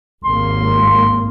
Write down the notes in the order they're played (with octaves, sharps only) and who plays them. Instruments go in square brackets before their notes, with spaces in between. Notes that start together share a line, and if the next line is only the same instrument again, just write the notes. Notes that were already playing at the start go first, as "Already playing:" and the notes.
[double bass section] G#1 D#2 A#3 [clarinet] C6